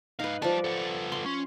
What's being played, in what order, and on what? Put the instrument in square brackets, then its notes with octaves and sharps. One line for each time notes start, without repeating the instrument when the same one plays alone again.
[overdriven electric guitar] G#2 F5 [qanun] D#4 B4
[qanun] F3 D5 [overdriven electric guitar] G3 A5
[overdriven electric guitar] B3 A4
[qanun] C6
[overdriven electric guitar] C#4